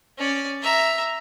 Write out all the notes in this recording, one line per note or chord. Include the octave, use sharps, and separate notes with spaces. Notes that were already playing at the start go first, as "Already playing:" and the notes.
C#4 D5
E5 A#5